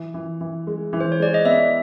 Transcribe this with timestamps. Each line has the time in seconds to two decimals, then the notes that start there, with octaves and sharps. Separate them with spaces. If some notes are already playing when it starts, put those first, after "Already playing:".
Already playing: E3
0.14 E3
0.41 E3
0.67 G#3
0.93 E3
1.00 C5
1.12 C#5
1.20 G#3 D5
1.34 D#5
1.45 B3 E5